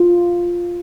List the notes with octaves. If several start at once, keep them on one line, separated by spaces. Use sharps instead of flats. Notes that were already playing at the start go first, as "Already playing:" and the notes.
Already playing: F4